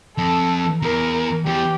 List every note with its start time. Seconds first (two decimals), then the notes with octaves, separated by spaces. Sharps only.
0.17 F2 A4
0.82 E2 A#4
1.46 E2 G4